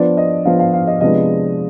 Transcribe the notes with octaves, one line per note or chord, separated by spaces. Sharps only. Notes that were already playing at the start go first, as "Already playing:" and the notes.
Already playing: F3 B3 D4 D5
D#5
F3 B3 D4 F5
F5
F5
D#5
C3 F3 G#3 B3 D4 D#5